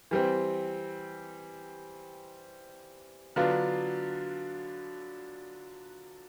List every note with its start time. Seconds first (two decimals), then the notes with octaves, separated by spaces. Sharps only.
0.11 E3 G3 C4
3.36 D3 F#3 B3 D4 F4